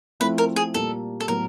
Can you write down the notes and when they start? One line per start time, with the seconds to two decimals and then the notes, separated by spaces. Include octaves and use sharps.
0.20 F3 A3 C4 E4 B4
0.38 A#4
0.56 G#4
0.74 A#2 G3 A#3 A4
1.20 A4
1.28 A2 F#3 B3 A#4